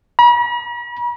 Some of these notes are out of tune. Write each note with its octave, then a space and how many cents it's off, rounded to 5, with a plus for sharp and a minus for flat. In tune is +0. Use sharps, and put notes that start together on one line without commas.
B5 -45